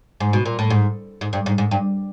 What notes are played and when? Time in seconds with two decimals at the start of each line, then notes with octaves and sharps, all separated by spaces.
0.20 G#2
0.33 B2
0.45 A#2
0.59 A2
0.70 G#2
1.21 G#2
1.33 G2
1.46 G#2
1.58 G#2
1.71 G2